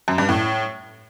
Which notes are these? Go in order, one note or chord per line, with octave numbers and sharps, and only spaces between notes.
F#2
G2
A2